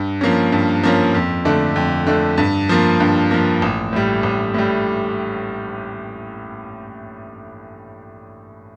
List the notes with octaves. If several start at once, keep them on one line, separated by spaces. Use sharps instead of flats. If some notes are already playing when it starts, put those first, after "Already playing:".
Already playing: G2
F3 A#3 C#4
G2
F3 A#3 C#4
F2
D3 A3 D4
F2
D3 A3 D4
G2
F3 A#3
G2
F3 A#3
A1
A2 G3
A1
A2 G3